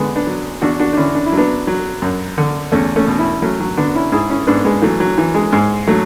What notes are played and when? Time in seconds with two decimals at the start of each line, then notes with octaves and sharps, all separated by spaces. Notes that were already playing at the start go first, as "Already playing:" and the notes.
Already playing: D3 G#3 B3
0.16 B3 D4
0.27 F#3
0.62 E2 D4 F#4
0.80 D4 F#4
0.93 D4
0.97 D3 C#4 E4
1.15 D4
1.26 E4
1.32 F#3
1.37 B3 D4
1.67 F#3
2.02 F#2
2.38 D3
2.72 E2 A3 C#4
2.96 A3 C#4
3.07 B2
3.19 C#4 E4
3.42 F#3 A3 C#4
3.60 F#3
3.77 D3 B3 D4
3.95 C#4 E4
4.12 G#2 E4 G#4
4.30 C#4 E4
4.47 G#2 B3 D4
4.65 G#3 B3
4.82 E3 F#3 A3
5.00 F#3
5.18 E3
5.34 G#3
5.52 G#2 G#3
5.87 F#3 A3